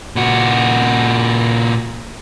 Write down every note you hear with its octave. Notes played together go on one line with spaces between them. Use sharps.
A#2 F#4